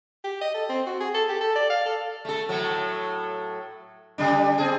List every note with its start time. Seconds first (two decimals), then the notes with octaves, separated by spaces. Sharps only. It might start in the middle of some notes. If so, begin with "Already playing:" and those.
0.24 G4
0.41 D#5
0.54 A4
0.69 C4
0.86 F#4
1.00 G#4
1.14 A4
1.28 G4
1.41 A4
1.56 D5
1.70 F5
1.86 A4
2.25 A3 A4
2.49 A2 F#3 A3
4.18 C#3 G3 D4
4.58 C4 G#4